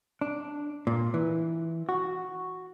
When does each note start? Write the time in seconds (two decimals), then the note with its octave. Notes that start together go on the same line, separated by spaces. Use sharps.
0.21 D4
0.87 A#2
1.14 E3
1.89 F#4